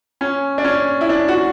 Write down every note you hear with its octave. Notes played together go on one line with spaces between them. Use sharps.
C#4
D4
C#4
E4
D4
F#4